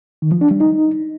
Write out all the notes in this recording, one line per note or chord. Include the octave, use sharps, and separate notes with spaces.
D#3
F3
D4
G3
D#4